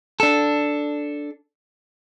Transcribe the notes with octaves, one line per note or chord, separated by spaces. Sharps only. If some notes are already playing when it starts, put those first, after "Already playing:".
D4 A4